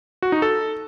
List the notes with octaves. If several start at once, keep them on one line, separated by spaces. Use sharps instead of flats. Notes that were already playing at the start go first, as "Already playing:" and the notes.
F#4
D#4
A4